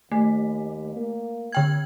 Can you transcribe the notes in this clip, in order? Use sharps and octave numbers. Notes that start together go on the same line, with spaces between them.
D#2 A3
A#3
D3 G5 G#6